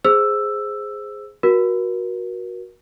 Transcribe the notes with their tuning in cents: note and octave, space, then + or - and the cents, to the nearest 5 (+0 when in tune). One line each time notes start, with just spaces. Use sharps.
G#4 +0 C5 +0 E6 +5
F#4 +0 A#4 +35